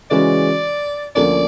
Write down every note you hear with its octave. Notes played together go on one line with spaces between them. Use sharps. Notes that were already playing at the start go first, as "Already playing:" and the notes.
C#3 E3 G#3 C#4 F#4 D5
D2 D3 F3 A#3 C#4 D5